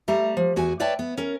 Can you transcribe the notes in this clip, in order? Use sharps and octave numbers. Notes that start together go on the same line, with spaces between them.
G3 A3 A#5
F3
E2 F#4 G#5
B4 C#5 D5 E5 G5 A5
B3
C#4 A#4